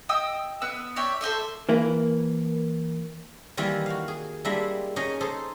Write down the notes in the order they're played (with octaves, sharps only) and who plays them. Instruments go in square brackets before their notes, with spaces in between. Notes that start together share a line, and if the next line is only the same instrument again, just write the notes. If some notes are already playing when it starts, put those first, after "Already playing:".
[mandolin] D#5 G5 D#6 E6
B3 B4 E6
C#5 D5 E5 G5
A4 C5 D#5 E5
[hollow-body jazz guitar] E3 A#3 E4
[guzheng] D#3 E3 G3 A#3 E4
F#4 F5
G#4
G3 G#3 A#3 D4 E4 E5
C#4 D#4 G#4 D#5
D#4 G#4 A4 C5